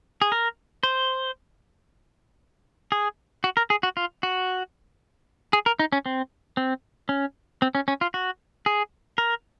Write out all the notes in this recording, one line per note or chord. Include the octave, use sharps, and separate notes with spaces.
G#4
A#4
C5
G#4
F#4
A#4
G#4
F#4
F4
F#4
G#4
A#4
D#4
C#4
C4
C4
C#4
C4
C#4
C#4
F4
F#4
G#4
A#4